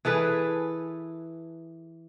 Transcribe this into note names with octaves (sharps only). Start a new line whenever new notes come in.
E3 G#4 A4 B4